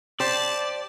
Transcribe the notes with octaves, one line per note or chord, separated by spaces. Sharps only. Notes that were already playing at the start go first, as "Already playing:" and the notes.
G4 C5 D5 A5